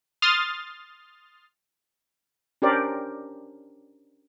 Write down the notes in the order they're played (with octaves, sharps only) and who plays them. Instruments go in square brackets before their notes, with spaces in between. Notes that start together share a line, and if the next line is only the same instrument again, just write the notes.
[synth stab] C6 D#6 F6 A6
[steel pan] C#4 D4 G4 A#4 C5 D5